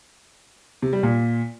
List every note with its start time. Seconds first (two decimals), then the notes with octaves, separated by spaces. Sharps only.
0.82 C3
0.93 G3
1.03 A#2